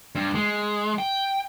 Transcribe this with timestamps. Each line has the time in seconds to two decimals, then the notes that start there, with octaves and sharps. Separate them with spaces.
0.15 G2
0.35 G#3
0.98 G5